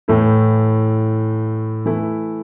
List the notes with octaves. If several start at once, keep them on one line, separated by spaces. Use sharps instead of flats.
A2 E3 A3 E4
E3 A3 E4